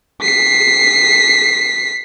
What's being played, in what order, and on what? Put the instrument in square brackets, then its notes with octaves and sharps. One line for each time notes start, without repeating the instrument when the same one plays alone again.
[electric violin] B6 C7